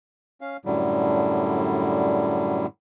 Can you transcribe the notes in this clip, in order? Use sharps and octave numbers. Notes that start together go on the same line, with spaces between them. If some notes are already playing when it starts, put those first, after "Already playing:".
C#4 F5
F#2 A2 D3 F#3 G3